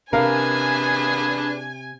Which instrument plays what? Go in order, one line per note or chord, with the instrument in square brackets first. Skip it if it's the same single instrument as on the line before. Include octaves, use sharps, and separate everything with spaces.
[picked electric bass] C3 [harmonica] D4 G#4 B4 [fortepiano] A#4 F5 [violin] G#5